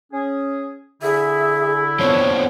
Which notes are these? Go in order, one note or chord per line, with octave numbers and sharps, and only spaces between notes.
C#4 G#4
D3 E4 G#4 E5
F3 B3 C4 D4 C#5